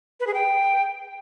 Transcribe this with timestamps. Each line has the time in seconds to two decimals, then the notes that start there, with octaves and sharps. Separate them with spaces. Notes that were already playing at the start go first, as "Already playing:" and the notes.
0.20 B4
0.27 G#4
0.34 G5